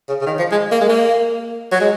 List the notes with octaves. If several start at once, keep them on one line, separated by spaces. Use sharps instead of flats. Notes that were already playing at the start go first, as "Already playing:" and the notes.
C#3
C#3
D#3
F3
G#3
A#3
G#3
A#3
F#3
G#3